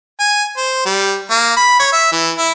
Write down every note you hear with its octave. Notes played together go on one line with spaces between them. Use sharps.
G#5
C5
G3
A#3
B5
C#5
E5
E3
E4